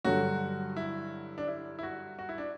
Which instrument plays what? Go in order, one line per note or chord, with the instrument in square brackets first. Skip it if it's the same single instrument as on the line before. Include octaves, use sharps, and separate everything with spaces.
[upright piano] G2 D3 F#3 [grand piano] F#4
[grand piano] E4
D4
E4
E4
F#4
F#4
E4
D4